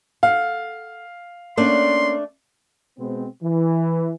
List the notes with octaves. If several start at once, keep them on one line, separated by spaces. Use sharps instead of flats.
A4 F5 F#5
A3 A#3 C#4 D4 D5 F#5 C6
B2 G#3 B3 C4
E3